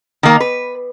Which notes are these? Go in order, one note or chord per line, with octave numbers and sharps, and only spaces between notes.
D#3 A#3
B4